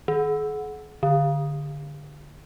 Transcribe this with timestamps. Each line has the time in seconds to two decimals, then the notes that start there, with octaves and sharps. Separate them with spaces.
0.08 D#3
1.03 D3